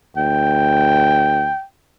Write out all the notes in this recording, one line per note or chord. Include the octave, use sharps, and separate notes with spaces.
D2 G5